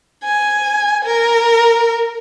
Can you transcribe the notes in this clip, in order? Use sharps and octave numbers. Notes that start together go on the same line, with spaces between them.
G#5
A#4